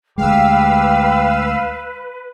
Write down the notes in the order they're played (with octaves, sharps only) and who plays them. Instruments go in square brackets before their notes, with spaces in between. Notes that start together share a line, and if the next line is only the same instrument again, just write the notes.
[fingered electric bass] D2 G#3 [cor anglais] G4 [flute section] B4 [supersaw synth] F5 E6